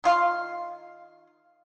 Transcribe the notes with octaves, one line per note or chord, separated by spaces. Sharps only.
D#3 F4 F5 C6